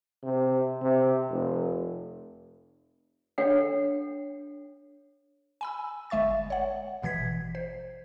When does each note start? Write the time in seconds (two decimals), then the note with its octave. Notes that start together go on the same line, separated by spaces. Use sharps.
0.23 C3
0.82 C3
1.29 F1
3.38 D4 A4 C#5 F#5 G5
5.61 G#5 B5 E6
6.10 G1 G#3 E5 C#6 A6
6.50 C#5 F#5
7.02 G#1 B2 E3 G#6 B6
7.55 C5